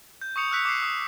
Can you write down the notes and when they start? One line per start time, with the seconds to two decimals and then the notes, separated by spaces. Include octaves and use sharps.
0.21 G6
0.36 C#6 D#6 C#7 F7
0.51 E6 F#6 B6 C#7 F7
0.65 D6 C7
0.82 D#6